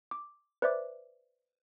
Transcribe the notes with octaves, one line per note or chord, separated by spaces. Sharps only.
D6
B4 C5 D5 E5 D6